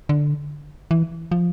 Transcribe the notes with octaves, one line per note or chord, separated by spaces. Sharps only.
D3
E3
F3